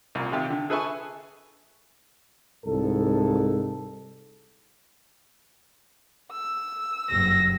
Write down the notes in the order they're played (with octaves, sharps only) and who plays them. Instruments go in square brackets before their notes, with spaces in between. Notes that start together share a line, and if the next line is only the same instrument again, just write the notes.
[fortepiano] C2 A#2
C3 D#3 F4 G4
D3
G#4 A4 B4 E5 G#5 C#6
[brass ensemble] C2 G#2 A4
[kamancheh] E6
[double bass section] F#1 G2 [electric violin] A#6